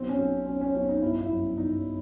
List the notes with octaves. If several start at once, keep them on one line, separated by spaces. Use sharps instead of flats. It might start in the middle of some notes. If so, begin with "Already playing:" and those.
Already playing: B1 C4
C#4
B1
B1 C#4
C#4
B1 C#4
D#4
G1 E4
E4
F#2
G1 D#4